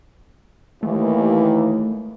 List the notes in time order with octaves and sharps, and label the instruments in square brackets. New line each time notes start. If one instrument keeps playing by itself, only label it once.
[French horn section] D#2 E3 [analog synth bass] A3